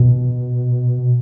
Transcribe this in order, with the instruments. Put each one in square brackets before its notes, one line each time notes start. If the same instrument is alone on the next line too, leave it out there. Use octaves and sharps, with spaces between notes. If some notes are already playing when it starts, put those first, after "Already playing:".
Already playing: [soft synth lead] B2